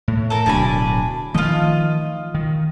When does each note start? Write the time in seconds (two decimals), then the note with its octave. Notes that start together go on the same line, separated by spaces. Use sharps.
0.08 A2
0.30 A4 A#4
0.46 D1 B2 F#3 D4 G#5 B5
1.34 D#3 F3 A3 F4 D#5
2.34 D#3